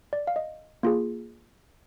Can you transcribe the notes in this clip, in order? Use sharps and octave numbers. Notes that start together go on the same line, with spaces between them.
D5
F5
D#5
A#3 F4 G#4